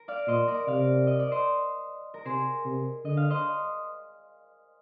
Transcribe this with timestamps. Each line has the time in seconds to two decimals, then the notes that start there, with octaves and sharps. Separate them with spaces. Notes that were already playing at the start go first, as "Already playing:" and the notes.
Already playing: A#4
0.08 D5 F5
0.27 A#2 C5 D#5
0.47 A#4 D5
0.67 C3 D5 F5
1.07 D#5
1.19 D5
1.31 C5 D#5
2.14 A#4
2.25 C3 G#4 C5
2.65 C3
3.05 D3 D#5
3.17 F5
3.30 C5 D#5